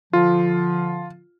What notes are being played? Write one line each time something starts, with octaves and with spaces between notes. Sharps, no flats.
D3 F3 F4